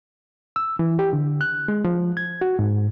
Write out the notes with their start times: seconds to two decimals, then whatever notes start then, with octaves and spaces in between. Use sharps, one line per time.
0.56 E6
0.79 E3
0.99 G4
1.13 D3
1.41 F#6
1.68 G#3
1.84 F3
2.17 G#6
2.41 F#4
2.59 G#2